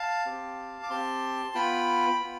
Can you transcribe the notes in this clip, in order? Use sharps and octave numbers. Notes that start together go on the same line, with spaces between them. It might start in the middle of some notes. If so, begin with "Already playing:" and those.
Already playing: F5 A5
C4 G4
D6
C4 G4 A5 C6
B3 F4 G5 B5
B3 F4